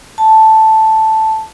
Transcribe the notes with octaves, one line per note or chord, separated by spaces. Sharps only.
A5